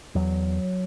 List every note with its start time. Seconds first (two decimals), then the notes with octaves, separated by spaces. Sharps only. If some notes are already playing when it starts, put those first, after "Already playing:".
0.15 E2 F#3